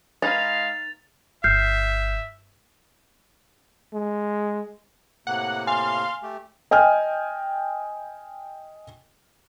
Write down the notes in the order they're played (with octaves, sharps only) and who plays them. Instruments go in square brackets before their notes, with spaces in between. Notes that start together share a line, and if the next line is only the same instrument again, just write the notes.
[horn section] G#3 F5 [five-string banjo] D#4 B4 [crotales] A6 F7
[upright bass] G1 [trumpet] E5 [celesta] F6 G6 C7
[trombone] G#3
[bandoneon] A2 C3 A#3 [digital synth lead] F#5
[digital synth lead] F5 [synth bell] G#5 [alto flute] C6
[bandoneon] A3 G4
[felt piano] D#5 G5 G#5 F6